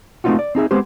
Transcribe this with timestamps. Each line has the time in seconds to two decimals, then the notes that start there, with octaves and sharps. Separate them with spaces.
0.24 A3 A#3 C4 D#4 F4 F#4
0.39 D5
0.55 C4 D#4 G#4 E5
0.71 G#3 B3 C4 G4 C5